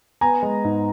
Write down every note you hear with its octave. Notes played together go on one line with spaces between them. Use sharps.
B3 G#5 A#5
G#3
G#2